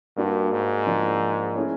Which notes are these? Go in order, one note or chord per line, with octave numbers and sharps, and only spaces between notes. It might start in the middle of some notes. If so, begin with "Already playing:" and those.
G2 A#3 D4 F#4
G#2
F3 A#3 D4
A3 C#4 E4 G#4 C#5